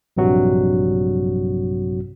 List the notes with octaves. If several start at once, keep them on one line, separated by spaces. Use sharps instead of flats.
A#1 G2 C3 F#3 F#4